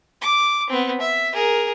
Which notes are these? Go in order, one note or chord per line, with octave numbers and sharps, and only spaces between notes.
D6
B3 C4
E5
G#4 A#4